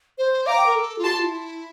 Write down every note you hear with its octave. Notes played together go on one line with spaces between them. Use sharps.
C5
F5 A#5 D6
G5
A#4
A4
F4
G4 A5 C6
F4
E4